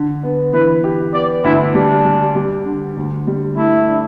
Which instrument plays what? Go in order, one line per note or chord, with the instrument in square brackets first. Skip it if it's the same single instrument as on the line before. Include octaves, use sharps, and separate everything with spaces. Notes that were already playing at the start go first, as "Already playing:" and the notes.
Already playing: [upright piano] D3
B3
[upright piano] E3 [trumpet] B4
[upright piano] G4
[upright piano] B3 [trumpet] D5
[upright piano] D2 [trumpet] E4
[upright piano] G3 [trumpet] D4
[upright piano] G3
G3
D3
D2
G3
[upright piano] A3 [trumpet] E4
[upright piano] D4